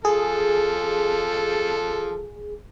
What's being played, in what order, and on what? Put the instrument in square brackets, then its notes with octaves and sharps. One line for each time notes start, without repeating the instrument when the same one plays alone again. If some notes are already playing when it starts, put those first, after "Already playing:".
[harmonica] F3 A4 [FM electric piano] G#4